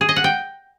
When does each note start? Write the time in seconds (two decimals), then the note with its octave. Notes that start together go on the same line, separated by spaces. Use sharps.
0.01 G#4
0.09 D#5
0.16 F#5
0.24 G5